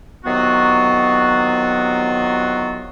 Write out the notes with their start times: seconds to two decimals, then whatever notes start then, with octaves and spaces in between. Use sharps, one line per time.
0.25 C3 D#3 F#3 B3 F4 F#4